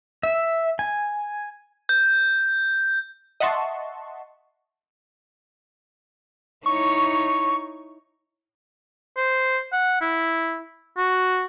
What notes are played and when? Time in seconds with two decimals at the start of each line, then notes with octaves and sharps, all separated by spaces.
0.23 E5
0.79 G#5
1.89 G6
3.40 D#5 E5 F#5 A5 C6 C#6
6.66 D#4 E4 C#5 C#6
9.17 C5
9.72 F#5
10.01 E4
10.97 F#4